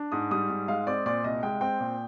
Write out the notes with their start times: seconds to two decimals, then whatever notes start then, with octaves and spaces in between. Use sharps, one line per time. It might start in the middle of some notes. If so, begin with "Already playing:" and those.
Already playing: D4
0.12 G#2 D#6
0.31 G3 D#6
0.49 G#2
0.68 G#3 F5
0.87 C4 D5
1.06 A#2 D5
1.24 C2 D#5
1.43 G#3 G5
1.61 C4 G5
1.80 A#2